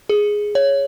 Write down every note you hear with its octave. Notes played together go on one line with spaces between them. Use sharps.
G#4
C#5